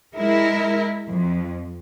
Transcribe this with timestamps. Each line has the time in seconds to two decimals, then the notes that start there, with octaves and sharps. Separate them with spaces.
0.15 G#3 E4 A#4
1.09 F2